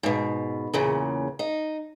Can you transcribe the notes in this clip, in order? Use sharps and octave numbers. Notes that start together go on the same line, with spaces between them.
G#2 B2
E2 A#2 C#3
D#4